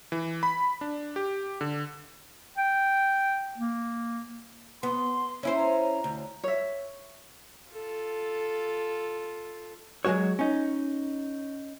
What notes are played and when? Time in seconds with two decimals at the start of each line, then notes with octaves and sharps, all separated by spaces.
0.12 E3
0.43 B5
0.81 D4
1.16 G4
1.61 D3
2.57 G5
3.58 A#3
4.83 B3 C6
5.43 C#4 E4 C5
5.55 A#5
6.04 D2
6.44 C#5 E5
7.71 F4 A4
10.05 F#3 G#3 A3 F#4 C#5
10.39 C#4 D#4